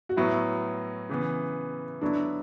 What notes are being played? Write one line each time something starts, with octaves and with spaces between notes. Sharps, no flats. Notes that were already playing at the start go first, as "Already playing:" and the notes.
F#4
A2 F#3 B3 E4
C#3 E3 B3
D3 F#3 B3 D4 E4